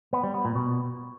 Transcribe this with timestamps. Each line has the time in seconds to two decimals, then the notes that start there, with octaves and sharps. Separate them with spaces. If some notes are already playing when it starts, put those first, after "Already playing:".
0.13 B3
0.23 G3
0.34 B3
0.45 A#2
0.55 B2